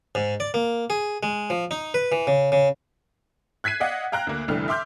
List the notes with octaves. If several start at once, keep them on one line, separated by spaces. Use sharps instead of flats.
G#2
D5
A#3
G#4
G#3
F3
D#4
B4
E3
C#3
C#3
F#6 G#6 B6 C7 D#7
D5 D#5 F5 F#5
F5 G5 A#5 F6 F#6
D2 A#3
F1 C2 D3 E3 A3 F6
E5 C6 D6 F6 G6